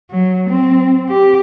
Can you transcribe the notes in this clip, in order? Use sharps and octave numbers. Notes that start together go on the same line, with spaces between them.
F#3
C4
G4